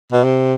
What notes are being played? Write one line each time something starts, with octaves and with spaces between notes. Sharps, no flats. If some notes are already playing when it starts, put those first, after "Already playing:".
B2
C3